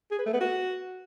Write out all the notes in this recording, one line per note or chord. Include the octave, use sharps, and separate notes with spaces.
G#4
B4
A3
B3
F#4